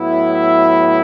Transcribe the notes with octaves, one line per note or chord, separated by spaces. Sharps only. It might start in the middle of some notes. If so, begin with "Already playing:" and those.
Already playing: A2 F#3 B3 E4
E5